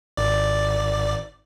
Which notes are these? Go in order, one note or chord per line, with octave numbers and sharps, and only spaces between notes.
G#1 D5